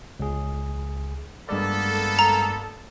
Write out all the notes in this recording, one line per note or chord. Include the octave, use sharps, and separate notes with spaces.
C#2 G#4
G2 G#3 A#3 B3 A4 D5
A#5